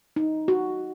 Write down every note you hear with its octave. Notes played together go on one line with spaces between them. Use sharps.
D#4
F#4